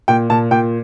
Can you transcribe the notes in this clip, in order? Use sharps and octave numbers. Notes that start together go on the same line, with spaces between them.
A#2 G5
A#2 A5
A#2 G5